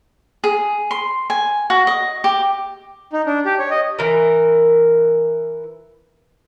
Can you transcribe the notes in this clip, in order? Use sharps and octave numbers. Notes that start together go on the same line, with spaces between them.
G#4
C6
G#5
F#4
D#5
G4
D#4
D4
G4
C#5
D#5
E3 A#4